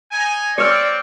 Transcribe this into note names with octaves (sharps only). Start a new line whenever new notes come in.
D#4 G#5
C4 C#5 D5 F6